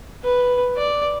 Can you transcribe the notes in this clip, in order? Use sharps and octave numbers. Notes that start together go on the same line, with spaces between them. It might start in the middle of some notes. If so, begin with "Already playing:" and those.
B4
D5